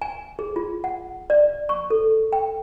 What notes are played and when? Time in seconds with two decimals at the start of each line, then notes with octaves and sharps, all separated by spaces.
0.02 G#5
0.39 G#4
0.56 F4
0.84 F#5
1.30 D5
1.69 C#6
1.90 A4
2.33 G5